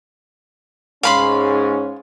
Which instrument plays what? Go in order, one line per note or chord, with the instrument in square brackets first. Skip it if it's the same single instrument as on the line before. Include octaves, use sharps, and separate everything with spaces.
[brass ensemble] G#2 C#4 [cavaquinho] F5 B5 C6